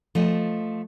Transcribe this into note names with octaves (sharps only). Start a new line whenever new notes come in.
F3 A3 D#5